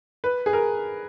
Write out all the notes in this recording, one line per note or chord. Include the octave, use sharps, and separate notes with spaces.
B4
G#4
A#4